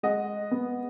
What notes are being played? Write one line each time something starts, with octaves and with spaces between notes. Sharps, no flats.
G#3 D#5 F#5
B3